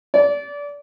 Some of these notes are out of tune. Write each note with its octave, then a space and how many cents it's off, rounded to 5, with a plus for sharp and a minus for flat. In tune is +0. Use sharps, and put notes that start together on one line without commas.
D5 -25